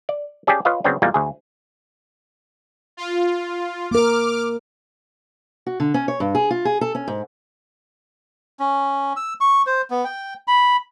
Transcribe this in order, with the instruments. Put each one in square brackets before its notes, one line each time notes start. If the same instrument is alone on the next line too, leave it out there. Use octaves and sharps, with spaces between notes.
[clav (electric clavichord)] D5
C#4 G4 G#4 D5 G5 A5
F4 B4 C#5 D#5 F5
C#3 F#3 B3 C4 D4
E2 A#2 G3 G#3 A#3
D2 G#4
[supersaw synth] F4
[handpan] A#3 A#4 [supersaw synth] D6 F6
[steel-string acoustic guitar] F#4
D3
C#4
C#5
G2
G#4
F4
G#4
A4
C#4
G#2
[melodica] C#4
E6
C#6
C5
B3
G5
B5